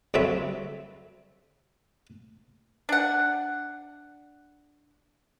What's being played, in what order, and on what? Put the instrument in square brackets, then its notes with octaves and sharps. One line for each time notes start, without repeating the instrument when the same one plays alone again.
[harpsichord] C2 D3 F#3 C4 E5
[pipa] D4 F#5